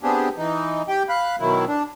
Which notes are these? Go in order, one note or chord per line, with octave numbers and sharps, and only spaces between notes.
B3 C4 D4 G4 G#4
E3 D#4
G4 G5
F5 B5 F#6
B2 D#3 F#3 E4
D4